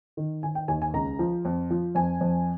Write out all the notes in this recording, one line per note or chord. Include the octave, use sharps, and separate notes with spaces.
D#3
D#3 G#5
G5
D#2 G#5
G#5
C#2 A#5
F3
F2
F3
F2 G#5
F2